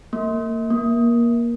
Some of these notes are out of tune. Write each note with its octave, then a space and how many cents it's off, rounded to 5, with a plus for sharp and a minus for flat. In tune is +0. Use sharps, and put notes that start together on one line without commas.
A#3 -30
A#3 +20